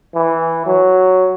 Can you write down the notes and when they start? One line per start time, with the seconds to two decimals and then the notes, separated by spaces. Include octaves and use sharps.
0.14 E3
0.66 F#3